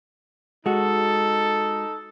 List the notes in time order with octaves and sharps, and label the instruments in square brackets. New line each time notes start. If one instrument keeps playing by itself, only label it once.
[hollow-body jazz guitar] G#3 F#4 [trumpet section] D#4 A4